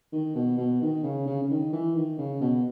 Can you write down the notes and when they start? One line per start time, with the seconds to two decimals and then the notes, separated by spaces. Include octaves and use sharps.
0.12 D#3
0.35 B2
0.58 B2
0.81 D#3
1.03 C#3
1.27 C#3
1.43 C#3
1.50 D#3
1.73 E3
1.95 D#3
2.18 C#3
2.41 B2